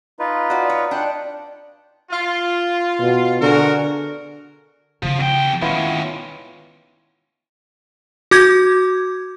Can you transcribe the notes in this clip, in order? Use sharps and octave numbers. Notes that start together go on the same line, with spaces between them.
D#4 F4 B4
F#4 D5
C#5
D4 F#5 G5
F4
B2
D3 F#4 G#4 A#4
C#3 F3 E4
E2 G5
D#3 G#3 A3 B3 C#4 E4 F4
F#4 D6 G6 G#6